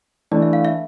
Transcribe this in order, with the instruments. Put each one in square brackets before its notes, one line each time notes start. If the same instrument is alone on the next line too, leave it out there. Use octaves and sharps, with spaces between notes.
[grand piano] E3 A3 D4 [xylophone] D5
[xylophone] E5
F5
E5